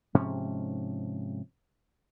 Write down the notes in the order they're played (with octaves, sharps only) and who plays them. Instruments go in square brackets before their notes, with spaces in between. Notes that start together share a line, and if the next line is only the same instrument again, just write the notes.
[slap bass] G#2 C3 F3 C#4